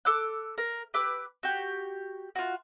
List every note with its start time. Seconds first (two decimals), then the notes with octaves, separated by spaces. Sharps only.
0.05 A4 D6 E6 F#6
0.58 A#4
0.94 G4 B4 D6 E6
1.43 F#4 G4
2.35 F4 F#4